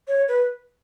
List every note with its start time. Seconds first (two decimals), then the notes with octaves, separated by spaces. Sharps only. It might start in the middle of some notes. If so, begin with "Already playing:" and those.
0.08 C#5
0.28 B4